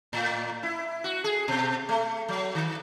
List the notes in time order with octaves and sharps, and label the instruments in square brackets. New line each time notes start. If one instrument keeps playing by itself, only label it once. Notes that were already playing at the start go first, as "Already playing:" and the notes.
[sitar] A2
E4
F#4
G#4
B2
A3
F#3
D#3